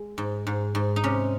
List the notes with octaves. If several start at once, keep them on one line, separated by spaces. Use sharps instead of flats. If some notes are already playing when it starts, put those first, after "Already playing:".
Already playing: G#3
G#2
G#2
G#2
D#4
C3 C#4